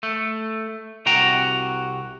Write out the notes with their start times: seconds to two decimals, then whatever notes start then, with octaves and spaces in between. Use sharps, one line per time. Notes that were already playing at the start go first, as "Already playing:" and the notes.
0.03 A3
1.06 C2 C3 F#4 G5 A#5